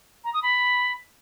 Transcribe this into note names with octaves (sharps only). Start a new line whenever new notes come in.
A#5
D#6
B5